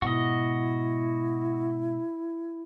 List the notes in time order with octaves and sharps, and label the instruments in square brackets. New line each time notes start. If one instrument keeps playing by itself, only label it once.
[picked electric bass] G#2 B2 [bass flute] E4 [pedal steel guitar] F#4 D#5